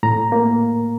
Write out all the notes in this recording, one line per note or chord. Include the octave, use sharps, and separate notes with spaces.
A2 A#5
A#3